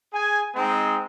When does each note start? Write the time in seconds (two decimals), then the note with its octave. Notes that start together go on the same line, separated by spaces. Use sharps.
0.13 G#4 G#5
0.56 G#3 C4 D#4